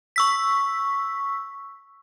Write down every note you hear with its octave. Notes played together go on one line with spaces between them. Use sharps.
C#6 E6 B6